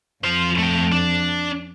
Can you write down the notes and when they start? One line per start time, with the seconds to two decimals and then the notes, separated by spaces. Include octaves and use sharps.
0.24 F2 F4 C5
0.59 A3 G5
0.92 D4